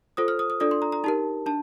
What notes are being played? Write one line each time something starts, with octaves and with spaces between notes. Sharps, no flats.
F4 A4 C5 D#6
F6
D#6
D#6
D4 F4 A4 D5 D#6
C6
A#5
A#5
D#4 G4 A#4 A5
D4 A5